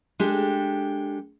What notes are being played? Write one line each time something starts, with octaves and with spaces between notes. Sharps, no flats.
G#3 D4 G4 A4